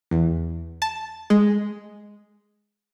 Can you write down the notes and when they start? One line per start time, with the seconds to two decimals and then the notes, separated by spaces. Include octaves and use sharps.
0.11 E2
0.82 A5
1.30 G#3